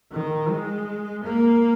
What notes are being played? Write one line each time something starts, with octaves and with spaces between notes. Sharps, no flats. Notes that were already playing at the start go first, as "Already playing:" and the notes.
D#3
G#3
A#3